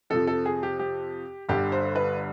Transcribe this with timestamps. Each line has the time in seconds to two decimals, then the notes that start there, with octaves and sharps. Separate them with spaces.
0.10 F2 C3 F3 A4
0.27 A4
0.46 G#4
0.63 G4
0.79 G4
1.49 G1 G2 D3 G4
1.72 C5
1.96 B4